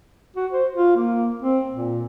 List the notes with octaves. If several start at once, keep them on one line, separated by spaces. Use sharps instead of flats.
F#4
C5
F4
A#3
C4
A#2